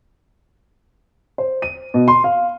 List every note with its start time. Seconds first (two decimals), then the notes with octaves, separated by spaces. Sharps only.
1.38 C5
1.62 D#7
1.94 B2
2.08 C6
2.24 F5